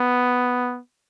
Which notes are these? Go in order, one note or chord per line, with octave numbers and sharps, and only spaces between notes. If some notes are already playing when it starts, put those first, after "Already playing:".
Already playing: B3